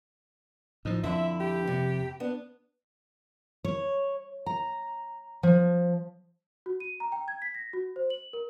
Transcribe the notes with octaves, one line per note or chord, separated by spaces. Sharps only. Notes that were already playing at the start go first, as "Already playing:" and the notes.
A2 F3 D#4
F2 D3 E4 E5
G4
C3
B3 D4
C#5
A#5
F3
F#4
D#7
A#5
G5
G#6
B6
A#6
F#4
C5
F#7
A#4